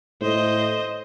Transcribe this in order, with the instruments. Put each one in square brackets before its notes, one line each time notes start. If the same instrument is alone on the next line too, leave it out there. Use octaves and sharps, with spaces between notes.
[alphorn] A2 [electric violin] C5 D#5